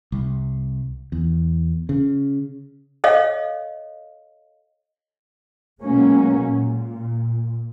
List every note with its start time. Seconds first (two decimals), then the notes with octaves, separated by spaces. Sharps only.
0.12 C2
1.12 E2
1.89 C#3
3.04 A4 C#5 D#5 F5
5.82 B2 F#3 G#3 A#3 C#4
6.43 A#2